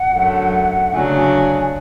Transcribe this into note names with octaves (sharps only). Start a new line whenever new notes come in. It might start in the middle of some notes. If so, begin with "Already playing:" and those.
Already playing: F#5
F#2 D3 F#3 A3
D2 C#3 F#3 A3 D4 G#5
G#5
G#5
G#5